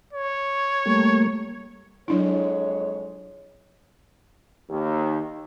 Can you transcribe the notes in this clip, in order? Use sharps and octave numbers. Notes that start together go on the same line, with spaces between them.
C#5
G3 A3 A#3
F2 F#3 G#3 D4 E4 C#5
D#2